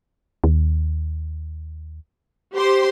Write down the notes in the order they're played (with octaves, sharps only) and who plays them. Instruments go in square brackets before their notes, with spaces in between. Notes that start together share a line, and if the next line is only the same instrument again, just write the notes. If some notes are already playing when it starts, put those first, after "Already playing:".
[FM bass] D#2
[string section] G4 C5 C6